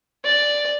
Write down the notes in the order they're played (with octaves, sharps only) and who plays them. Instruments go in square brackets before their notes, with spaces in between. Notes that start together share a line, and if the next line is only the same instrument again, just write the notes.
[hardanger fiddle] D5